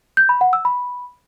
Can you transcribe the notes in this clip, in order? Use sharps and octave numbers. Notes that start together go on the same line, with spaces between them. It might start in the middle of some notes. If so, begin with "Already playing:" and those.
G6
B5
F#5
E6
B5